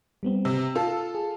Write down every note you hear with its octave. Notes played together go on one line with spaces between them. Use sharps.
G3 B3 C4
C3 E6
F4 A4
G#4